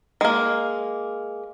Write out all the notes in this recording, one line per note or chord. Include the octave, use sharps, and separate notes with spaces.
G#3 A#3